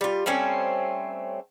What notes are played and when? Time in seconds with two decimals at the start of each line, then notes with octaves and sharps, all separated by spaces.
0.01 G3 F4
0.26 G3 A3 C4 C#4